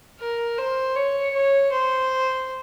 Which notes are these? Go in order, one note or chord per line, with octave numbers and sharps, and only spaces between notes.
A#4
C5
C#5
C#5
C5